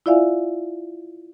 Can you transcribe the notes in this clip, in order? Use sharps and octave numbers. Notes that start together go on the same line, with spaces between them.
E4 F4 D5 E5 F5 G#5